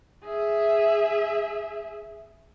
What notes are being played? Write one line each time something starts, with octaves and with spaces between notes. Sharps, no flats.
G#4 E5